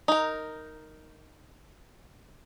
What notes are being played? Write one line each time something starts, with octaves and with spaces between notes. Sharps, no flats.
D#4 A#4